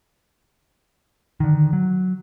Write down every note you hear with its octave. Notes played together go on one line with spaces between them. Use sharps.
D3 D#3
F#3